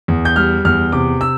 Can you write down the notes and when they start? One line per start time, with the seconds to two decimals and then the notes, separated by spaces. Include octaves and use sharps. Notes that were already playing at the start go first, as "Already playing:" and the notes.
0.08 E2
0.25 G6
0.36 G3 F6
0.65 E2 F6
0.92 C3 D6
1.21 E6